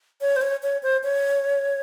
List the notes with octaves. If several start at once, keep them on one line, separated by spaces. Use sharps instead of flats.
C#5
C5
C#5
C#5
C5
C#5